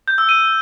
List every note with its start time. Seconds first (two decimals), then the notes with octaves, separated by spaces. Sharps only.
0.08 G6
0.18 E6
0.29 D#7